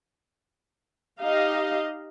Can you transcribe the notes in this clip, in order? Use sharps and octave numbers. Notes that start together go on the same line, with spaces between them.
D#4 G4 D#5 F5